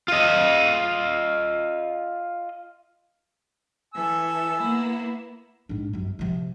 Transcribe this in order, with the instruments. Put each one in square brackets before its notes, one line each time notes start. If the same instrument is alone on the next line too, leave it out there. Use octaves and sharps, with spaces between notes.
[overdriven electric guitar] F4 D#5
[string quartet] E3 A4 [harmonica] G#5 E6
[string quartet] A#3 B3 E4
[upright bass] G#2 D4
G1 F#2
C3 F3